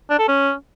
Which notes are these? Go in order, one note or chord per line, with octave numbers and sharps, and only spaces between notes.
D4
A4
C#4